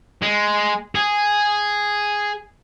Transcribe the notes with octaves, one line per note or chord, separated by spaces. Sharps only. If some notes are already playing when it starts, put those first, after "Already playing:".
G#3
G#4